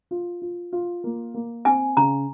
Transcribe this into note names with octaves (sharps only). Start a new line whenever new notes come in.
F4
F4
F4
A#3
A#3
C4 G#5
C#3 A#5